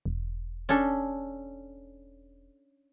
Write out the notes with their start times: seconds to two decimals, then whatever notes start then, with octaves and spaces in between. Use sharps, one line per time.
0.05 E1
0.69 C#4 D4 A4